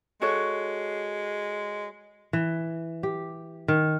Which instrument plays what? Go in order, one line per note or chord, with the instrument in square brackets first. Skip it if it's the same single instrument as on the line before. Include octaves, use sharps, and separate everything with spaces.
[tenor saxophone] G#3 [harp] F#4 A4 C#5
[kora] E3
G4
D#3